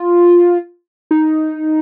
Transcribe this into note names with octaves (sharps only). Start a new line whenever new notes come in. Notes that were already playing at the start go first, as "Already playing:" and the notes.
Already playing: F4
D#4